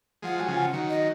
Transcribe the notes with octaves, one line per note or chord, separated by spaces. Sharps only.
F3 G#3 F#5
F#3 G#5
C#3 F3
F#5
D#3 F#3
D#5